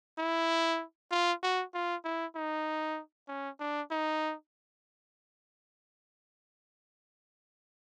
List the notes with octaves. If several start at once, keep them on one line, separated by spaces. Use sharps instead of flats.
E4
F4
F#4
F4
E4
D#4
C#4
D4
D#4